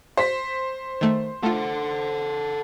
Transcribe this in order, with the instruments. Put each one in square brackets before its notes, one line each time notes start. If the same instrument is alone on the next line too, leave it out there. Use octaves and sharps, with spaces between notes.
[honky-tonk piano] C5 B6
[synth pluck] D#3 A3
[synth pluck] A3 F4 [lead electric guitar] A4 F#5